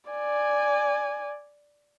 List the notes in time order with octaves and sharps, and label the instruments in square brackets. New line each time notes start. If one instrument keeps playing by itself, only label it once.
[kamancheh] D5 G#5